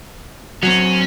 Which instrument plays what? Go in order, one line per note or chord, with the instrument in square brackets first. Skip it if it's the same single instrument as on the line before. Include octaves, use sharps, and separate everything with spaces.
[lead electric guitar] F#3 C4 [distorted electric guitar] C#4